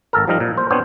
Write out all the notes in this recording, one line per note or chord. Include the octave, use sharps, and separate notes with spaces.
G#1 A4 A#4
F3 G3 D#4 A#4
A#2
C5
B3 C4 D4 C5 C#5